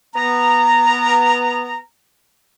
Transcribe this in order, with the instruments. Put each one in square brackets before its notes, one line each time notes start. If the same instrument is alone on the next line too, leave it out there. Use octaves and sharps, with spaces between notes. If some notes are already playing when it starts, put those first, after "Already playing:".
[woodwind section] B3 A#5